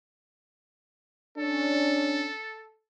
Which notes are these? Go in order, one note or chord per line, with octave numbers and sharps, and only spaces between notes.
C#4 D4 A4